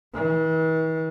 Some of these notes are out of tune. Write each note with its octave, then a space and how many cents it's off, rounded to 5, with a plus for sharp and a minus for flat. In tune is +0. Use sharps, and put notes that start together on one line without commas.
E3 -45